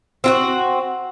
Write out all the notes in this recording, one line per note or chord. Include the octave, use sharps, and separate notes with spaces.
C4 F4 F#4